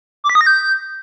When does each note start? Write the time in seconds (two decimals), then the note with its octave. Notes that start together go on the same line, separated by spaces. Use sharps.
0.24 D6
0.30 B6
0.35 D#6
0.41 A#6
0.46 G6